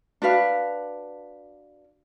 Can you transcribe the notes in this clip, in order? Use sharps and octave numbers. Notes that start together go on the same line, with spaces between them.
D4 F#4 B4 F5